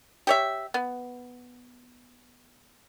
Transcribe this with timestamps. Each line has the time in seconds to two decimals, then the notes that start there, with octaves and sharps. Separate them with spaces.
0.27 G4 C#5 E5
0.74 B3